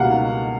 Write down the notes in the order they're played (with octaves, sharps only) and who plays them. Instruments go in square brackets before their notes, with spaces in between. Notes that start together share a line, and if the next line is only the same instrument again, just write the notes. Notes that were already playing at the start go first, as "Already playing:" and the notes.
Already playing: [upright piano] C#2 B2 G3 A#3 F5 F#5